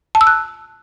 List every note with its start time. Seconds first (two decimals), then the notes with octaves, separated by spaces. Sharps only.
0.15 A5
0.21 E6
0.27 F#6